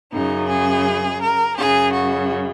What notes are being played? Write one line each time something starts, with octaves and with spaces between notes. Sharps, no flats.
F#2 C#3 D#4
G#4
A#4
F#2 C#3 G#4
F#4